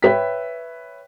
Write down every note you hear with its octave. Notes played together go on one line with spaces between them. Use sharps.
B4 C#5 E5 G5 B6